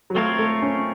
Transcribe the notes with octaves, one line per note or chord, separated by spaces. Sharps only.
F#3
A3 C4 F4 A#4 C#5 F5
A3
C#4